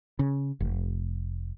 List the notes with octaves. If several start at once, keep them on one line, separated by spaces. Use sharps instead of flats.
C#3
F1